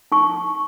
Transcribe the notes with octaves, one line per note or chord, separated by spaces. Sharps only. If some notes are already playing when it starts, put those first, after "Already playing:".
D#4 C#6